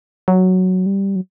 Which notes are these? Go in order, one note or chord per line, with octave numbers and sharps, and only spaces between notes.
F#3
G3
F#3